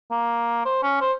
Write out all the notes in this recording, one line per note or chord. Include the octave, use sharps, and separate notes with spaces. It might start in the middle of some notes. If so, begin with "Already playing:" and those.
A#3
C5
C#4
C5